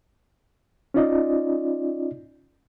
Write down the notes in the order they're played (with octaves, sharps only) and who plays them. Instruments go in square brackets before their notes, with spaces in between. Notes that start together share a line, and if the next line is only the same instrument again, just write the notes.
[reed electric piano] C#4 D#4 F4 D5 D#5